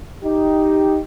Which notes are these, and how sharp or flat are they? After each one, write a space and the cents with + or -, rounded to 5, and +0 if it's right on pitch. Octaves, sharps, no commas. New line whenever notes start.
D#4 +0 G4 +0